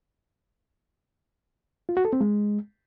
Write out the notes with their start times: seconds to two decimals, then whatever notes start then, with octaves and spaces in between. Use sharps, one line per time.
1.89 F4
1.97 F#4
2.05 A4
2.13 C4
2.21 G#3